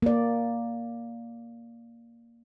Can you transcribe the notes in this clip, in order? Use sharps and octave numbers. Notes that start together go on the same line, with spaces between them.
A#3 D5